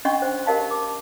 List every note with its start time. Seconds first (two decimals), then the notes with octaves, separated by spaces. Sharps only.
0.05 C#4 D4 D#5 F#5 C6 C#6
0.22 C5
0.46 G4 A#4 D#5 F5 A5
0.71 D6